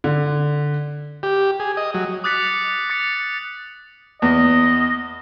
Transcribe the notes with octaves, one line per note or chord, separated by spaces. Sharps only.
D3
G4
G#4
D#5
F#3
D6 D#6 F#6 A6 B6 C#7
C#7
D6 A6 C#7
E2 D#5